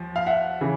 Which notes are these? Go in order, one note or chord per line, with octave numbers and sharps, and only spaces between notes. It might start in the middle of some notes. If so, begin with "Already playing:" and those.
Already playing: D#2 F3
F5
E5 F#5
C#3 E3